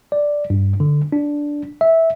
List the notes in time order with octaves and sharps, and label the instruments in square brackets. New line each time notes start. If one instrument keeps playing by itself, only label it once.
[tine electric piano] D5
G2
D3
D4
E5